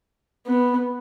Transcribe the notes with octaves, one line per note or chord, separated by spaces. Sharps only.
B3